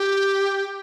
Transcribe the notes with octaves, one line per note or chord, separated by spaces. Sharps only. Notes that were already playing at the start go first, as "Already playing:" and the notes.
Already playing: G4